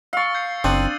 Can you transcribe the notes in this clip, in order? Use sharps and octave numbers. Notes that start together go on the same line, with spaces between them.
F5 C#6 E6 A6
G6 C7 C#7
F#1 C4 D4 D#6 D#7 F#7